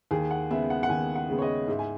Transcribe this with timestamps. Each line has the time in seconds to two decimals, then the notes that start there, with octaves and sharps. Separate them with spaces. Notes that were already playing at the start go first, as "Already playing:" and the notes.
0.11 D#2 G#4
0.31 F#5
0.50 C#3 G#3 B3 E5
0.70 F#5
0.83 F#5
0.89 D#2 G#5
1.15 F#5
1.29 C#3 G#3 B3
1.39 C#5
1.42 D#5
1.68 G#2 E5
1.79 G#5